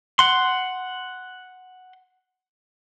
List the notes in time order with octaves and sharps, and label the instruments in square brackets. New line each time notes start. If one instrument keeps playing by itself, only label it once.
[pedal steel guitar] F#5 C6